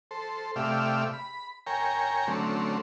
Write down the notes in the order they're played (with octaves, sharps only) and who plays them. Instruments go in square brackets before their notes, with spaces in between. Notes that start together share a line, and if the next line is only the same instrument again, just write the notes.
[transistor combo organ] A4 C5
C3 A3 G4 D5 E5 F5
B5
A#4 C#5 G5 G#5 A#5
D3 F#3 A3 C4 C#4